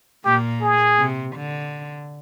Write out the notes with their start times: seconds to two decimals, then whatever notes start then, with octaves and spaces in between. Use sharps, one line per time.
0.25 A#2 A#3 G4
0.62 G#4
0.99 C3
1.35 D3